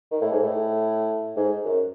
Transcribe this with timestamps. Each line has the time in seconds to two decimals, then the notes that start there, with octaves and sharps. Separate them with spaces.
0.11 D#3
0.21 A2
0.32 G#2
0.42 A2
1.36 G#2
1.65 F#2